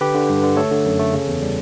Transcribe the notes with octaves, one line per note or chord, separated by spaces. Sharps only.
D3 G4 B4
D3
G2
D3
A3 A4 C#5
D3
F#2
A3
C#3
E2
G3